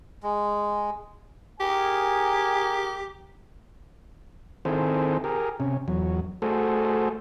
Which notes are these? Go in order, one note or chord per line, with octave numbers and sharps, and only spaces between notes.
G#3
G4 G#4 A#4 G#5
D#3 C4 E4 G#4 A4 C5
G4 G#4 A#4
C3 C#4
E2 F#3
A3 F#4 G#4 A4 C5